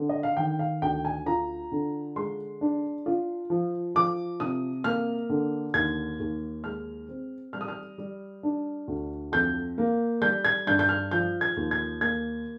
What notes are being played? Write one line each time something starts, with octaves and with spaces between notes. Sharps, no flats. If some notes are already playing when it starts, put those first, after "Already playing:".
Already playing: D3
D#5
F5
D#3 G5
F5
D2 G5
G#5
F4 A#5
D3
G#3 C6
D4
F4
F3
F3 D6
C3 D#6
A#3 F6
D3
D#2 G#6
D#2
G#3 F6
C4
G3 F6
D#6
F6
G3
D4
D2
F2 G6
A#3
G3 G6
G#6
G2 G6
G6
F6
F3 G6
G#6
D#2
G#6
A#3 G#6